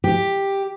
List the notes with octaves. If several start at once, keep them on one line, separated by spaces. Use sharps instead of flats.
G4